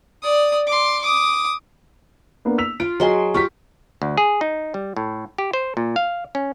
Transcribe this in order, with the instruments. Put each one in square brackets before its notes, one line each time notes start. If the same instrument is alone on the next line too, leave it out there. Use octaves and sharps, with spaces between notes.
[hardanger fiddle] D5 D#6
C6 D6
D6 D#6
[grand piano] A#3 B3 D4
E6 B6 F7
[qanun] F4 [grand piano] D7
[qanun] F#3 C6 [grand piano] G#4 D#5 G#5
[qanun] F4 G4 [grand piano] C#6 B6
[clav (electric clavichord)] D2
G#4
D#4
G3
A2
G4
C5
A#2
F5
C#4